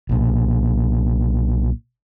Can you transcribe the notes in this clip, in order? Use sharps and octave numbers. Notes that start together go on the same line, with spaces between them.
B1 A#2